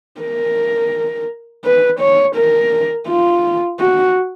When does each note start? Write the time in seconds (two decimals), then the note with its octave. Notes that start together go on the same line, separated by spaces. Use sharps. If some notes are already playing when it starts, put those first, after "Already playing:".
0.21 A#4
1.65 B4
2.00 C#5
2.36 A#4
3.08 F4
3.80 F#4